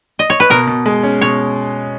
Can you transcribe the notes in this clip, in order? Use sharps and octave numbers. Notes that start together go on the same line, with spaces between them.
D#5
C#5
B4
B2 A#4
B2
G#3
C#4
B2 C#5